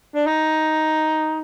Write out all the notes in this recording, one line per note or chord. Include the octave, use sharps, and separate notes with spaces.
D4
D#4